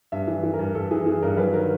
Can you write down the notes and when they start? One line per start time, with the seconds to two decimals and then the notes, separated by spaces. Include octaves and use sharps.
0.12 G2 E5
0.27 E3
0.43 E3
0.54 A#4
0.59 G2
0.75 G2 A4
0.91 E3 G#4
1.06 E3 G#4
1.22 G2 A#4
1.37 F#3 B4
1.53 D#3 A#4